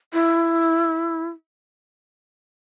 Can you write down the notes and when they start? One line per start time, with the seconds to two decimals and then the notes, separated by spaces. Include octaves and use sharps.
0.14 E4